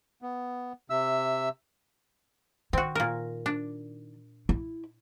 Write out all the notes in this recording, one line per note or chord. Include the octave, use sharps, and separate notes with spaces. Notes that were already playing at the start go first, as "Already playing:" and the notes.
B3
C3 E5 E6
D#3 C4 F#4
A#2 A#4
D4
E4